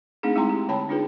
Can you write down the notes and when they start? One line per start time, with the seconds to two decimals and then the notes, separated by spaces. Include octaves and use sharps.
0.23 A3 C4 D4 D#4 G#4
0.36 G#3 E4 G5 A#5 C6
0.49 G4
0.68 D3 C#5 G5 A5 B5
0.89 D4 D#4 F4 G#4 B4